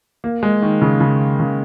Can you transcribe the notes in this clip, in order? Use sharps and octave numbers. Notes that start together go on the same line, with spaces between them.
A#3
G#3
D#3
C#3
C#3
C#3